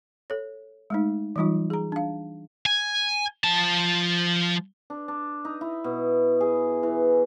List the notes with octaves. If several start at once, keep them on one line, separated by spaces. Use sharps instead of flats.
A4 C#5
G#3 A3 D#4
E3 F#3 G3 D#4 F4
G#4 A#5
D4 F5
G#5
F3 A5
D4
D4
D#4
E4
B2
G#4
E3